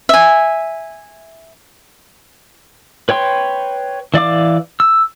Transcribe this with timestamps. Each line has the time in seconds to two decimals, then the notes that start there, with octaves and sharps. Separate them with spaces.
0.09 E5 G#5
3.09 B4 C#5 G5 C6
4.14 E3 D5 F5 D6
4.80 E6